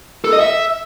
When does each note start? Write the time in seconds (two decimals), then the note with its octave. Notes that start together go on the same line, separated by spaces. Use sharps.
0.25 A4
0.33 D#5
0.41 E5